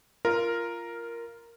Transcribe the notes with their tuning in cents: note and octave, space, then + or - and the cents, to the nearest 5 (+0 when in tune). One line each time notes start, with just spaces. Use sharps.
F4 -15 A#4 +0